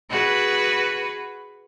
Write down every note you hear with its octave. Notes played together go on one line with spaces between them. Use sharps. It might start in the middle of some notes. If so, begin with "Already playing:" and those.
F#4 G#4 B4